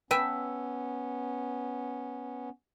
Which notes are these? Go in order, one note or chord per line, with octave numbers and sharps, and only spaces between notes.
B3 C#4 B4 E5 G5 A5